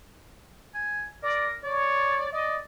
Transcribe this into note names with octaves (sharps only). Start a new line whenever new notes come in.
G#5
A#4 D5
C#5 D5
D5 D#5